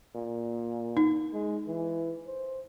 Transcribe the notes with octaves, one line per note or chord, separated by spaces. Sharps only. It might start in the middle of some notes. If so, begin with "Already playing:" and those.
A#2
D#4
G#3
E3
C5